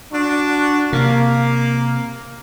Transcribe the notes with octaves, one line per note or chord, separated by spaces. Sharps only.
D4 F#4
C3 A#3